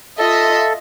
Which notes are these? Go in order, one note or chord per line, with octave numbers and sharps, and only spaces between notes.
F4 A4 D#5 E5